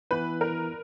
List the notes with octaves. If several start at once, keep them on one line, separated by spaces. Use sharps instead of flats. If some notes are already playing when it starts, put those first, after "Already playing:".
E3 B3 E4 B4
A#4